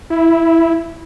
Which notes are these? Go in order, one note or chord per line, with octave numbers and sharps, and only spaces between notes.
E4